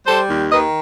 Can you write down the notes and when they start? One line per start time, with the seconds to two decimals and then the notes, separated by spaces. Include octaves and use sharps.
0.07 G3 A4 C5
0.30 D#2
0.52 D#3 B4 D#5